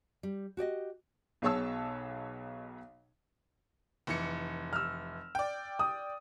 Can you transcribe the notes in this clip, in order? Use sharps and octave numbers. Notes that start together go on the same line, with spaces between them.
G3
F#4 G4 D5 D#5
B1 B2 G#4 C#5 A5 E6
F1 E3 C#7
E6 F6
D5 G5
D#6